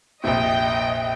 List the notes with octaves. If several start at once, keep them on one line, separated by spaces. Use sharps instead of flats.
F1 A#1 D#5 E5 G5